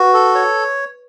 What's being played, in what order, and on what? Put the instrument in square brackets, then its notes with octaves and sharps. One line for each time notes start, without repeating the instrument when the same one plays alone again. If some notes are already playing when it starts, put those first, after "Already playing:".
Already playing: [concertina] F#4 [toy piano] B4
[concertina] A4
C#5